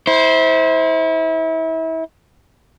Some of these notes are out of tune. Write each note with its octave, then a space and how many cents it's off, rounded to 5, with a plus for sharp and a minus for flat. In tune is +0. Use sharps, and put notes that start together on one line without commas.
E4 -30 C5 +0